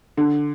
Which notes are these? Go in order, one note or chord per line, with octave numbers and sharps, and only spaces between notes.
D3